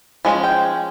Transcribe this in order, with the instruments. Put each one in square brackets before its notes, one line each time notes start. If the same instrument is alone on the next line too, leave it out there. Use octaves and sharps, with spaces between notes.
[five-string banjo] F3 G#3 C#4
G5